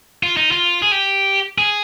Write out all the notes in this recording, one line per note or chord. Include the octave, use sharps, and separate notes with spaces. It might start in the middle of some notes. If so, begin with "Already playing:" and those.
F4
D#4
F4
G#4
G4
G#4